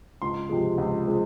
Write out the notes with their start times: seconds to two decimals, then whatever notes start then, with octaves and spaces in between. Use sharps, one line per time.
0.22 C#2 C6
0.49 C3 F3 G#3
0.78 C#2
1.06 C3 F3 G#3